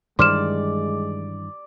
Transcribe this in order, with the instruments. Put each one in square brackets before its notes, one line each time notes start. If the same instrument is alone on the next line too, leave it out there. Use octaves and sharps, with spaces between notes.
[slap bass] G2 D#3 E3 [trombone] G#3 [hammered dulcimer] D5 [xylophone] C6 F6 E7